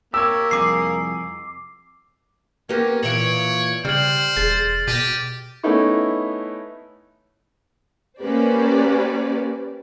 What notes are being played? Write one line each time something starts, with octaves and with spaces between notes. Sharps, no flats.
A#3 G4 C#5 E6
C2 F2 G#4 D6 C7
A#3 B3 C#4 G4
A#2 E3 C#5 D7 F#7
C#3 G3 C5 F6 F#7
E1 G#4 A6
B2 G4 A#6 D#7
A3 B3 C#4 D#4 E4
A#3 C#4 G4 B4 C5 D5